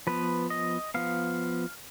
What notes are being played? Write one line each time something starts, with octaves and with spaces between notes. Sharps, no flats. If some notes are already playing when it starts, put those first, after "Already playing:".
F3 B3 B4
D#5
F3 B3 F5